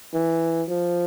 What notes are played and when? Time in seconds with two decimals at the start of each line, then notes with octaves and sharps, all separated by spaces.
0.14 E3
0.69 F3